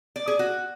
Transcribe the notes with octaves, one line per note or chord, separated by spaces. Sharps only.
D5
G#4
F#4